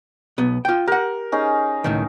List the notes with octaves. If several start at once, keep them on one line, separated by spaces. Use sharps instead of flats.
B1 B3
F4 G5
G4 A#4 F#5
C#4 D#4 G#4
C#2 A2 D#3